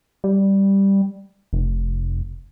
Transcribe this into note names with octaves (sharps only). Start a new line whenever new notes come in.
G3
F1